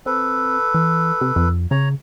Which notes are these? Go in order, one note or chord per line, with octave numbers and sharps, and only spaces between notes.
C4 A4 B4
E3
C3
F2
C#3 C#5 A#5